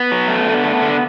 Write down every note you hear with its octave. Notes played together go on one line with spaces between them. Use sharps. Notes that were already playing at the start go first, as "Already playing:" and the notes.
Already playing: B3
F#3
A3
D3
A3
D3